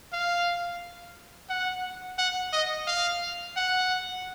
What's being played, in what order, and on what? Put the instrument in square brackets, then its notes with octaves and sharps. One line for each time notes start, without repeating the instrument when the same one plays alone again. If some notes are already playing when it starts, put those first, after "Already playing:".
[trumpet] F5
F#5
F#5
D#5
F5
F#5